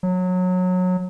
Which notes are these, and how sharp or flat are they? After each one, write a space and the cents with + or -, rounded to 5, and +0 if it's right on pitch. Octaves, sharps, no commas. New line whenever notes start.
F#3 -20